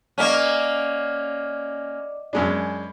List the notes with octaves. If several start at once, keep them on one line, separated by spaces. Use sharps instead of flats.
A#3 C#4 D5 D#5 F#5 D6
F#2 G#3 D4 B5